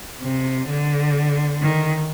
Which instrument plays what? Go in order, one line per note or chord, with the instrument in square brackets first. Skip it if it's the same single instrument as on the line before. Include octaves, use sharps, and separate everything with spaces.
[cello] C3
D3
D#3